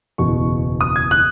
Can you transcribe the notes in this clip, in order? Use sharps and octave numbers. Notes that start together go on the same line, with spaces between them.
F#1 E2 B2 C#6
D#6
G#6
F#6